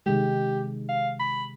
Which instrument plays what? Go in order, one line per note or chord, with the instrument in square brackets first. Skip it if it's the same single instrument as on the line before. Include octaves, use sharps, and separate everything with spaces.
[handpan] C3 D#3 G#3 [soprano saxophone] G4
[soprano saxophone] F5
B5